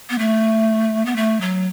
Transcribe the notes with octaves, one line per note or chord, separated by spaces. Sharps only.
B3
A3
B3
A3
F#3